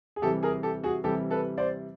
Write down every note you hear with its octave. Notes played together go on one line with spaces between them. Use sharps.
G#4
C3 E3 G3 G4 A4
G#4 A#4
G4 A4
F#4 G#4
C3 E3 G3 G4 A4
A4 B4
C5 D5